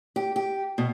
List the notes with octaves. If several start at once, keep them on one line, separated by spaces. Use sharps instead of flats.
G4
G4
B2